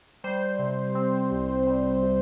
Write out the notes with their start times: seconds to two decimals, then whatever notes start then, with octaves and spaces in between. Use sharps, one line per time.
0.24 G3 C5
0.59 C3
0.95 C4
1.31 C2
1.66 G3
2.03 C3